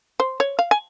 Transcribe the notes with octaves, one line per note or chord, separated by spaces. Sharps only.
C5
C#5
F5
G#5